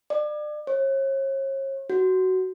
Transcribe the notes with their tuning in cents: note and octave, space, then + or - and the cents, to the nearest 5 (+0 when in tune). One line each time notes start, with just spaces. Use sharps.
D5 +35
C#5 -40
F#4 +15